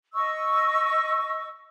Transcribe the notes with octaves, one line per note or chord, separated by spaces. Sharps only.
D#5 C#6 E6